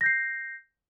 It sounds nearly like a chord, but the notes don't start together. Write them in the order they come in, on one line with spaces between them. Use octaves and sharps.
A#6 G6 C7